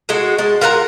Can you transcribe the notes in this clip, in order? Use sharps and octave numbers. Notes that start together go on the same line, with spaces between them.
G#3 F#4 G#4 A4
G#3 A5
F4 A#4 F#5 A#5